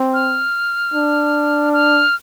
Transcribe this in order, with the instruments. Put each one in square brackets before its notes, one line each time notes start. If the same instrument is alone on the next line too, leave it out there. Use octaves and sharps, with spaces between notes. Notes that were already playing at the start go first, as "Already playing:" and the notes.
Already playing: [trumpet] C4
[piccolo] F6
[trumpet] D4
[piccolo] F6